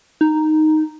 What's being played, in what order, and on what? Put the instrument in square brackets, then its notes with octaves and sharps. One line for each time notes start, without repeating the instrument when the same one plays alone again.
[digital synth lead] D#4